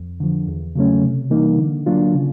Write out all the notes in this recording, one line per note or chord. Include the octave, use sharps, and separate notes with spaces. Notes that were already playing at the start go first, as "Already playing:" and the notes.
Already playing: F2
D3 F3
E2
C#3 F#3 A3 C#4
C3
E3 G3 A#3 D#4
D3
F#3 A#3 D4 F4
C#3